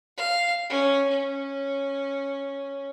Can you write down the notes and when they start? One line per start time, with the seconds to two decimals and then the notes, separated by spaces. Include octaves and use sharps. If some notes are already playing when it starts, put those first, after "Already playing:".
0.17 F5
0.69 C#4
1.10 C#4